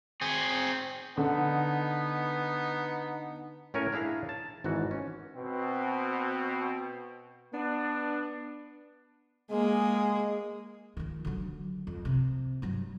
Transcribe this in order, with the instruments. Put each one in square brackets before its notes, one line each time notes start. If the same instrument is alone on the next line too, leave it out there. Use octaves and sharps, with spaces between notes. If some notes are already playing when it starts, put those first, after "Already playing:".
[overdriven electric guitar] C4 G#4
[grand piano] D3 [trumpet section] B3 D#4
[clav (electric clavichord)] A2 C#4 A#4 C#5 G#5
D4 E4 G#4 F5 A#5
A5
G#1 G#2 E3 F#4
C#4
[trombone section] B2 C4
[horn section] B3 D4
[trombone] G#3 [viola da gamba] A#3 G#4
[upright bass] D#3 F3
D3 F#3
F2
C3
G2 F#3